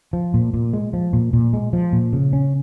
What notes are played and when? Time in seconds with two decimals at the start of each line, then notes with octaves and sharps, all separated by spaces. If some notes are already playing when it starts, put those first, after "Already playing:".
0.13 F3
0.34 A#2
0.54 A#2
0.73 G#3
0.93 F3
1.13 A#2
1.33 A#2
1.53 G#3
1.73 F3
1.93 A#2
2.13 C#3
2.33 C#4